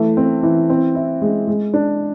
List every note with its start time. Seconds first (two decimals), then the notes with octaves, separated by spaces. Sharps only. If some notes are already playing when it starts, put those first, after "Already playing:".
Already playing: E3 A3
0.17 C4
0.43 E3
0.70 C4
0.95 E4
1.22 G#3
1.48 G#3
1.74 D4